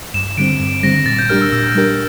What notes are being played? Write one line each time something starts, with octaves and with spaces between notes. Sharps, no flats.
G2 E7
D3 G3 C4 D7
G2
D3 G3 C4 A#6
A#2 A6
G6
G3 D4 G4 A#4 F6
E6
A#2 E6
G3 D4 G4 A#4